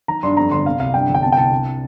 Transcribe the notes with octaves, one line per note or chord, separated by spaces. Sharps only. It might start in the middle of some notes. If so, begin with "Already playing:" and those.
D#3 A#5
G2 C6
F2 A#5
G1 C6
C3 F5
C2 F5
G2 G5
G1
G5
C3 A5
G5
C2 A5
C3